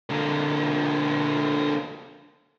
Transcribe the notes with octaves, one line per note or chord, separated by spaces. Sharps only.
D3 A#3